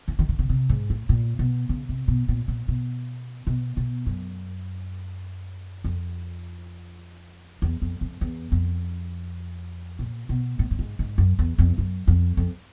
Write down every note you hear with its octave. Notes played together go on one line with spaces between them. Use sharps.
E3
D#3
D3
C#3
C3
G#2
A2
A#2
B2
C#3
C3
B2
A#2
A#2
B2
B2
B2
F#2
F2
E2
F2
F2
E2
F2
A#2
B2
A2
G2
G#2
G#2
F#2
E2
F2
F#2
F2
F2